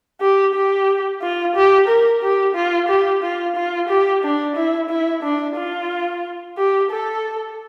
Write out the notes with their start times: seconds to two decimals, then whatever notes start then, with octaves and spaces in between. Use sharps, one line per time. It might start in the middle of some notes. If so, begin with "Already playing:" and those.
0.21 G4
0.54 G4
1.22 F4
1.55 G4
1.88 A#4
2.22 G4
2.55 F4
2.89 G4
3.23 F4
3.56 F4
3.89 G4
4.23 D4
4.56 E4
4.89 E4
5.23 D4
5.56 F4
6.58 G4
6.91 A4